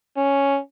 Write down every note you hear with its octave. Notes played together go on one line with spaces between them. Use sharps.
C#4